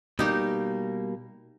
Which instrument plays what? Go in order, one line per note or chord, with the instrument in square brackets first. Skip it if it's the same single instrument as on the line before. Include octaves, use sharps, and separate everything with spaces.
[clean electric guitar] B2 G3 A#3 [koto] D#4 G4